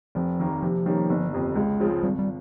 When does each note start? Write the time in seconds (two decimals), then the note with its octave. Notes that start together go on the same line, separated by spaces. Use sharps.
0.15 F1 F3
0.39 D#2 D#3 A#3
0.63 C3 F3
0.86 D#3 G3 A#3 C#4
1.10 G1
1.33 F2 C3
1.56 C#2 G#3
1.80 C#3 F3 C4 F4
2.03 G#1 G3
2.19 G3